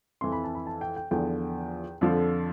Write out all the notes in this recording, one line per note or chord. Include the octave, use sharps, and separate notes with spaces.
F2 E3 C6
B5
A5
B5
A5
G5
G5
E2 D3 F3 G5
F2 D3 F3